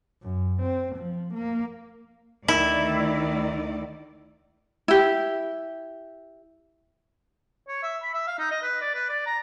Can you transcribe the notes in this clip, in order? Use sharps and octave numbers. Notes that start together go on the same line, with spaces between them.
F#2
C4
F3
A#3
D2 D#3 E4 D5
E4 G4
C#5
E5
B5
E5
F5
D#4
D#5
B4
D5
B4
D5
A#5